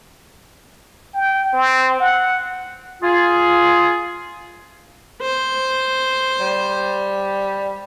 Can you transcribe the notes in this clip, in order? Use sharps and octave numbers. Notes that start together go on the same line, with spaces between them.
G5
C4
F#5
F4 G#4
C5
G3